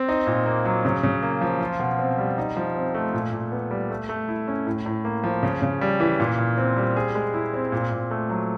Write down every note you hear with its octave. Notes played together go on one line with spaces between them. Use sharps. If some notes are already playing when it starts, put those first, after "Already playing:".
Already playing: C4
D#4
A#2
A#3
F#3
C#3
C#3
A#3
F3
F4
B2
C4
G3
D#4
F3
C4
A3
A#2
A#2
B3
G3
A3
A3
E4
C#4
A2
A2
A#3
F3
C#3
C#3
G3
E3
A#2
A#2
C4
G3
G#4
G#3
E4
C4
A#2
A#2
A3
F#3